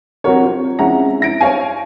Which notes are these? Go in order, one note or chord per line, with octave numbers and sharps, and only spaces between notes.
C2 F#3 F#4 A#4 C#5
C4 F4
F2 G#3 C#4 E4 F#5 A#5
E4 A#6 D7
C5 C#5 F5 G#5